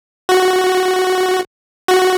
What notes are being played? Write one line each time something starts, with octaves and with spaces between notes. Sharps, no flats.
F#4
F#4